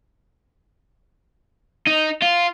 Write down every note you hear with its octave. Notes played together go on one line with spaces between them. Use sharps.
D#4
F4